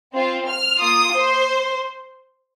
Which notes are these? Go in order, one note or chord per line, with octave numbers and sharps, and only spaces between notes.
C4 F4
F6
A#3 F4 D#6
C5